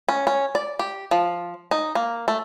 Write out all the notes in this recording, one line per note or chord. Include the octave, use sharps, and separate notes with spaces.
C#4
C#4
D5
G4
F3
D#4
A#3
A3